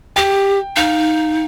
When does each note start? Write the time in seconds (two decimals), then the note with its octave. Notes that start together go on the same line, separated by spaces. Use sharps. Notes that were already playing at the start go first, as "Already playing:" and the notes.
0.16 G4 G5
0.76 D#4 F5